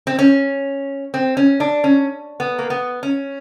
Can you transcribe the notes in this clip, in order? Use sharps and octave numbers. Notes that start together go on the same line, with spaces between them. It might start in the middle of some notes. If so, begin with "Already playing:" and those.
C4
C#4
C4
C#4
D4
C#4
B3
A#3
B3
C#4